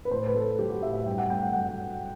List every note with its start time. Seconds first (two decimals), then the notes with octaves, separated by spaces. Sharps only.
0.05 B4
0.11 A2 C5
0.27 B4
0.35 A3 A4
0.59 F#3 G4
0.71 F#4
0.82 A2 E5
0.94 E5
1.06 G2 G5
1.18 F#5
1.30 A3 G5
1.42 F#5
1.53 F#3 F#5